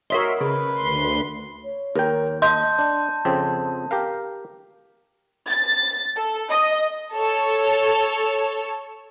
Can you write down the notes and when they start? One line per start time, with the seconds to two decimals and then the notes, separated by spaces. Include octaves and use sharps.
0.10 F#4 A#4 C#5 D#5 E5 C6
0.41 C#3 B4
0.77 D2 C6
1.64 C#5
1.95 D#2 A#4 G5
2.42 D#5 A5 C6 G6
2.79 D4
3.25 F2 C#3 C4
3.91 G4 A#4 F5
5.50 A6
6.17 A4
6.50 D#5
7.13 A4 C#5